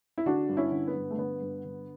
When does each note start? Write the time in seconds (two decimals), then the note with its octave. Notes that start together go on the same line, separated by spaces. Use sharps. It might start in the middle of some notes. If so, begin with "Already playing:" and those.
0.18 E4
0.26 D3 D4 F#4
0.49 G2
0.57 C#4 E4
0.72 D3
0.88 B3
0.95 G2
1.11 A3
1.18 D3 B3
1.41 G2
1.65 D3